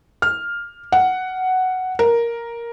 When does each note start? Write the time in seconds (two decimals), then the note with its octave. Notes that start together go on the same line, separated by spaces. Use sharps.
0.22 F6
0.92 F#5
1.99 A#4